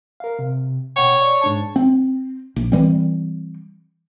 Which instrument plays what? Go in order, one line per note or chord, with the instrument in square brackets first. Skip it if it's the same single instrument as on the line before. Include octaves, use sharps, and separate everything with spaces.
[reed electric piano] A#4 F5
C3
[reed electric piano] B2 F#5 G5 [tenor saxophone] C#5
[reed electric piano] D5
G#2 D4 A5
[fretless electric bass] C4
A#1
E3 G3 C4